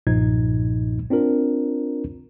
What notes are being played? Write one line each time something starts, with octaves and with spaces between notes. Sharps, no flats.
B1 G2 A#2 F3 D#4 G#6
C4 D4 F4 A#4